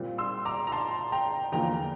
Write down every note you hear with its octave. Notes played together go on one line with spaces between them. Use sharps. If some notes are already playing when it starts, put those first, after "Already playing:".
Already playing: A#2 G3 C4
C6 E6
A#5 D6
A#5
A5 C6
G5 A#5
E2 D3 F3 A#3 G5 A#5